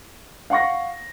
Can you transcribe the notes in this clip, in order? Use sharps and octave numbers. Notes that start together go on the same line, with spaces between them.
F5 F#5 C#6 A#6